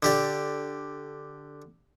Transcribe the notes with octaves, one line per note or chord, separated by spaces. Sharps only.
D3 G4 D5